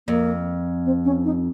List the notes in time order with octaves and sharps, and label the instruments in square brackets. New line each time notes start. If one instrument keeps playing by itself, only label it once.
[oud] F2 [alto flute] A#3
[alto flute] C4
C#4
D#4